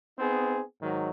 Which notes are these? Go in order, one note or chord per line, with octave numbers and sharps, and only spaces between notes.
B3 C4 D#4 G#4
G#2 D#3 F#3